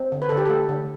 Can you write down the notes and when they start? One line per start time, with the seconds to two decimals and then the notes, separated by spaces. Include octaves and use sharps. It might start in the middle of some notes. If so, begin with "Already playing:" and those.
Already playing: C4
0.12 D3
0.22 B4
0.29 D3 A4
0.37 G4
0.46 A3 A4
0.69 D3